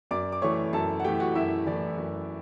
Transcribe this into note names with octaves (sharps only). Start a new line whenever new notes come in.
F#2 D5 D6
D6
E3 A3 C#5 C#6
F#2 A4 A5
F#5
E3 A3 G4 G5
F#4 F#5
F#2 E4 E5
E3 A3 D5
F#2